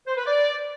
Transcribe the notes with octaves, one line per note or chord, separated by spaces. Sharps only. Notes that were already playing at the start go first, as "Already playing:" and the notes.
C5
B4
D5